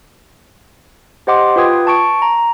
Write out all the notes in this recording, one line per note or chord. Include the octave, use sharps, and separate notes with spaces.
G4 C5 D#5 F#5 C6 D6
F4 B4 G5 D#6 G#6
A5 C#6 D7
A#5